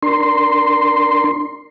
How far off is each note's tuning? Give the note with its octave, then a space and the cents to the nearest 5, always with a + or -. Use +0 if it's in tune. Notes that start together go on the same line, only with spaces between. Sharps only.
D4 +0 A#4 +0 C6 +0